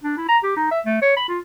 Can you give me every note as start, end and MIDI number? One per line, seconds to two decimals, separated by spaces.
0.03 0.15 62
0.17 0.27 64
0.28 0.38 82
0.43 0.53 67
0.56 0.68 63
0.71 0.80 76
0.86 0.98 57
1.02 1.15 73
1.16 1.24 83
1.29 1.39 65